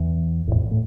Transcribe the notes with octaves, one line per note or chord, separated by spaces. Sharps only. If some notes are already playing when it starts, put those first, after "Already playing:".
Already playing: E2 E3
A1 A2
F2
A2